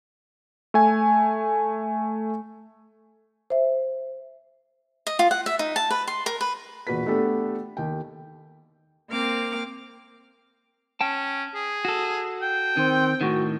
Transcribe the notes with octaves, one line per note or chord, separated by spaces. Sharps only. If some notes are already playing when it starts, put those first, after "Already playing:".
A3 G#5
C5 E5
D#5
F4
F#5
E5
D#4
A5
B4
C6
A#4
B4
E1 A#2 F#4 B4 B6
A3 B3 D4 G4 A4
D#2 G5
A#3 C4 D6 F6
C#4 G5 A5
G#4
F#4 A4
G5
D#3 C4
A2 D#3 F#4